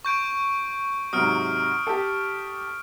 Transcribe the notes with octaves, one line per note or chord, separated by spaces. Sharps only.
C#6 G6 D7
G#2 C3 F#3 D#6 F6 D7
G4 A4